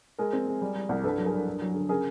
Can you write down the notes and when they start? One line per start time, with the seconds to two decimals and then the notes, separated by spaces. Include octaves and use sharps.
0.18 G#3 G#4 A#4
0.33 C4
0.47 G#3
0.61 G3
0.75 G3
0.89 C2
1.04 G2 A4 B4
1.18 F#3
1.26 G#4 A#4
1.33 G2
1.47 G2
1.61 F#3
1.75 D3
1.89 C#3 G#4 A#4